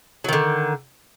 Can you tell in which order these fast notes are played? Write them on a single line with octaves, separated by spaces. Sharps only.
F#3 D#3 D3